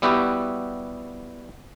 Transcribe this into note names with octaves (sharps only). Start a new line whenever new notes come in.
G3 B3 E4 F#4 G4